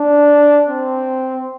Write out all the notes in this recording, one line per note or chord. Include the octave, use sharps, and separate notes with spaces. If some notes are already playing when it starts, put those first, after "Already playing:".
Already playing: D4
C4